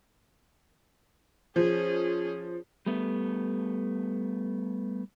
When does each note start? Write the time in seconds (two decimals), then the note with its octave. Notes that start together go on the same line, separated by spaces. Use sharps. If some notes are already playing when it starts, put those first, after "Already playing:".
1.56 F3 C#4 G#4
2.86 G3 A3 B3